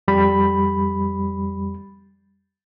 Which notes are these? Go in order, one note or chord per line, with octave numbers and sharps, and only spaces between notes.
F2 G3 B5